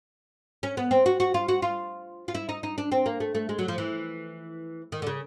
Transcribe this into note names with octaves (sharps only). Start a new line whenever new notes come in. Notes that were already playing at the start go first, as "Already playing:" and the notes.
C#4
B3
C4
F#4
F#4
F4
F#4
F4
F4
E4
D#4
D#4
D4
C4
A#3
A3
A3
G#3
F#3
F3
E3
D#3
D3
C#3